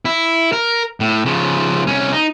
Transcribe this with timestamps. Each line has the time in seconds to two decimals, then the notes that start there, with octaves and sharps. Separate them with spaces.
0.05 E4
0.52 A#4
1.00 A2
1.26 C#3 F3
1.87 C2 C#4
2.12 D#4